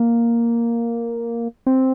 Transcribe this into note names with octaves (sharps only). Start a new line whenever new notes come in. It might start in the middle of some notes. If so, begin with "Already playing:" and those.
Already playing: A#3
C4